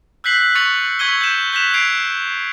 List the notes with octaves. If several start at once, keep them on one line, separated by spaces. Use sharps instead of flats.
E6 F#6 G6 B6 C7 F#7
C#6 A6 C#7 F7 F#7
C#6 E6 G#6 B6 D#7 G7
G6 E7
F#6 G6 B6 E7 F7
G#6 C7 D7 F7